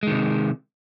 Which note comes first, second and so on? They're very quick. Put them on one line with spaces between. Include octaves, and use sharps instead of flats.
G#3 D#3 C3